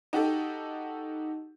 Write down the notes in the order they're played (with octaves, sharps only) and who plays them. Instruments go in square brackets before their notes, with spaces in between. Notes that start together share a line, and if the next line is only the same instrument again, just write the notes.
[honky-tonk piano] D#4 F#4 G4 A4